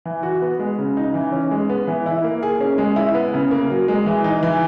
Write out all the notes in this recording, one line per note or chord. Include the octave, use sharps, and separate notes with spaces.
E3
F#4
B3
G#3
C#3
D#4
E3
C#4
G#3
B3
E3
E4
A#3
G#4
C#4
G#3
E4
B3
C#3
A#3
F#3
G#3
E3
D#4
E3